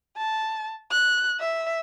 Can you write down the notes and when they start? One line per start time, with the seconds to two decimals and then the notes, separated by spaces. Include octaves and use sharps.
0.17 A5
0.91 F#6
1.40 E5